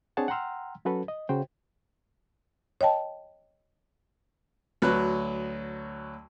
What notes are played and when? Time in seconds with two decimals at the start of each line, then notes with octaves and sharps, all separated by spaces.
0.17 C4 D4 G#4 C#5 F#5 A5
0.28 F#5 G5 A#5 C6 E6 F6
0.85 F#3 C#4 F#4 A4 B4
1.08 D#5
1.29 C#3 F#4 C5 G5
2.81 C#5 D#5 G5 A5
4.82 D2 F#3 B4 F#6